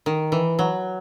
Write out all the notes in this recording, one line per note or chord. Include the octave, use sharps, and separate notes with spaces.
D#3
E3
F#3